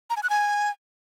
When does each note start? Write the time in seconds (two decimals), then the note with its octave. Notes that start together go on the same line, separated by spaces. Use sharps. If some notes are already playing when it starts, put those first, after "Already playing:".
0.10 A#5
0.16 G#5
0.23 F#6
0.30 G#5